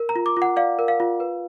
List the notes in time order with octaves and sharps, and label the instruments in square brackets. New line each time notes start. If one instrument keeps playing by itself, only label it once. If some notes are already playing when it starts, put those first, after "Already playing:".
Already playing: [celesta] A#4
A#5
F4
D6
F4
F#5
D5 F5
A#4
F5
F4
B4